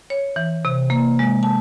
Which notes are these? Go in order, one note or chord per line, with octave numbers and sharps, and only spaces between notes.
C#5
E3
C3
A#3
G#3
A5